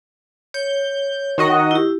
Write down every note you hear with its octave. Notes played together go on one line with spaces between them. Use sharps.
C#5 G6
D#3 F#4 D#5
E4 G4